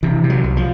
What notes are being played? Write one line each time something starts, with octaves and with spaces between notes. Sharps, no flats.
C3 E3
C3
F#3
C2
F3